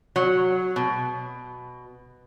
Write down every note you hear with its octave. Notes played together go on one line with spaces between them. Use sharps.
F#3
B2